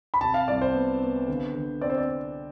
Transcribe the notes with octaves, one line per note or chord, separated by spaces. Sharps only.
B5
C3 A5
F5
C2 D5
C5
B3
B3
D3
D3
C4 D5
C5
D5
C4